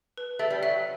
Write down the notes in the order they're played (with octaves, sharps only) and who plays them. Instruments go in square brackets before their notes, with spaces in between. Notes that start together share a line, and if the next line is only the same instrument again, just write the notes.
[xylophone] B4
[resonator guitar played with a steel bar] A3 [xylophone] E5
[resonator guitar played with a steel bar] G3
[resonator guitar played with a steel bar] F#3 [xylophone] E5